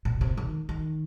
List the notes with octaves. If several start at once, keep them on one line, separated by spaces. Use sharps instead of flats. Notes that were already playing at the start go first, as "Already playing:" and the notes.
A#2
C3
D#3
D#3